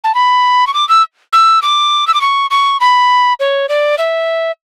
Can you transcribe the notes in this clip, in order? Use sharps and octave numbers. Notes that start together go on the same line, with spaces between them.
A5
B5
C#6
D6
E6
E6
D6
E6
D6
C#6
C#6
B5
C#5
D5
E5